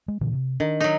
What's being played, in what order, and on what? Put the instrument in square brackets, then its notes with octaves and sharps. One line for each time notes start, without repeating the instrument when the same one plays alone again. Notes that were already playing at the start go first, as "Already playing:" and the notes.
[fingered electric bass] G#3
A#2 D3 E3
C3
[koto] D#3 [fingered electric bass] D4
[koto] F#3 D#4